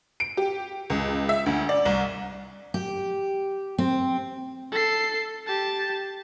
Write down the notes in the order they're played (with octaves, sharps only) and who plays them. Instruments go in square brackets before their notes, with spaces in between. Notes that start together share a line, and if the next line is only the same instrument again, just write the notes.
[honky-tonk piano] D7
G4
C#2
E5
D2
D5
C2
[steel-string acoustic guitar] G4
C4
[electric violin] A4 C7
G4 A5